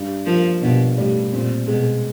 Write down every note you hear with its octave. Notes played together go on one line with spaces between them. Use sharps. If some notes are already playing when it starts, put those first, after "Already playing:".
Already playing: G2
F3 A#3
G2 B2
A2 G3
A#2 C4
B2 G#3